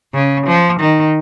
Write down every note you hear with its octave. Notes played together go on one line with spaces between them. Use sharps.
C#3
F3
D#3